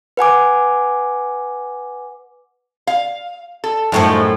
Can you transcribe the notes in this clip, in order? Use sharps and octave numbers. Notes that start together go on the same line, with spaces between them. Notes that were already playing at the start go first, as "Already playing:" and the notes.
B4 F#5 G#5 D6
F5
A4
F#2 A2 D#3 F3 G#3 A3